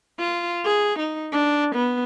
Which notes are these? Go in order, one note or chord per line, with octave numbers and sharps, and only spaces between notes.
F4
G#4
D#4
D4
B3